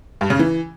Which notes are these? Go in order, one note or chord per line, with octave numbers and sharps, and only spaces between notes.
G2
C#3
E3